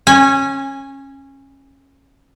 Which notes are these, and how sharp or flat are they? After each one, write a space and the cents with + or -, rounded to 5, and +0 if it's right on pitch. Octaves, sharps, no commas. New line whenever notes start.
C#4 -20 G#5 +0